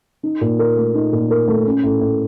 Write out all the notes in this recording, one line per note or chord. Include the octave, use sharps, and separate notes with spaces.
D#4
A#2
A#4
A3
D#4
A#2
A#4
A3
C#4
A2
A2